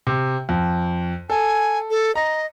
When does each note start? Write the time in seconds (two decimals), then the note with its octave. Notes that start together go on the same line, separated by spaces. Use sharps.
0.07 C3
0.49 F2
1.30 A4 G#5
1.90 A4
2.15 D#5 A#5